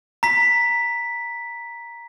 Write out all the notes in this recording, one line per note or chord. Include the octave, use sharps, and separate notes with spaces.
A#5 B6